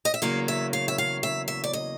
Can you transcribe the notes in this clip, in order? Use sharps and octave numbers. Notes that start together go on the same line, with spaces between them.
D#5
E5
E2 C#3 F#3 A#3 F5
E5
F5
E5
F5
E5
E5
D5
D#5